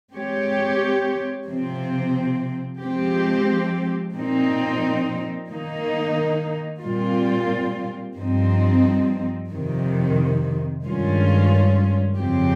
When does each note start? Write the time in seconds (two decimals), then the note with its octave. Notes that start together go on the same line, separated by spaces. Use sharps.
0.13 G#3 C4 G4 C#5
1.46 C3 F3 C4
2.80 F3 G#3 C4 G4
4.14 A#2 F3 C4 D#4
5.48 D#3 A#3 D#4
6.81 A#2 G3 C4 F4
8.16 G2 F3 C4 D#4
9.49 F2 C3 D#3
10.84 G2 D#3 G#3 C#4 F4
12.17 F2 C#3 F3 C4 G4